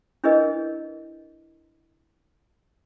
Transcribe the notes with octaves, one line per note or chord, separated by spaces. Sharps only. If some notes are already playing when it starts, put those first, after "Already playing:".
D4 E4 G#4 A#4 B4 D#5